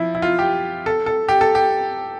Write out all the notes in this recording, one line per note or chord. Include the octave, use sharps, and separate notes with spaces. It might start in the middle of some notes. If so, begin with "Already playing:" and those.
Already playing: F3 E4
E4
F4
G4
A4
A4
G4
A4
G4